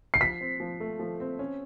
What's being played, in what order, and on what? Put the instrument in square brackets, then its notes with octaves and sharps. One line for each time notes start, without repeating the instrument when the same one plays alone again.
[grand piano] C7
[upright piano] F3 [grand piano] B6
[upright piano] C4
F3
A3
F3
C4
C#4